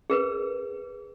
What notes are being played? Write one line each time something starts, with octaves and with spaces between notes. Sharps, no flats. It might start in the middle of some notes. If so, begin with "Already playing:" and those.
G#4 A#4 B4